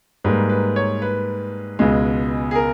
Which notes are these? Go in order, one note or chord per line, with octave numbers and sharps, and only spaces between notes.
G#2 G3 A#3 B4
B4
C#5
B4
C#2 B2 G#3
G#4
A#4